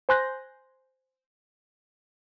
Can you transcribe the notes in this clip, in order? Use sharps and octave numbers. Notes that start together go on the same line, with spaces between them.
C5 G#5 C6 F#6 G6 A#6